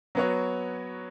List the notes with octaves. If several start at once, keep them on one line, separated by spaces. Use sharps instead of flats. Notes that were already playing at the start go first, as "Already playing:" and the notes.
F#3 B3 F#4 C#5